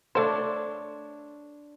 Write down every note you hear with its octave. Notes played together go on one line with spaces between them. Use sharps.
A3 D4 C5 C#5